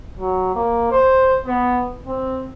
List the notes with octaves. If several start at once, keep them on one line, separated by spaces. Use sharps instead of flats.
F#3
A#3
C5
B3
C4